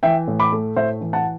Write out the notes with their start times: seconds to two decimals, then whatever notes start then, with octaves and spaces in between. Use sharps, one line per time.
0.03 E3 E5 G5
0.28 A2
0.40 B5 D6
0.52 A3
0.76 A2 C5 E5
1.01 E3
1.13 F#5 A5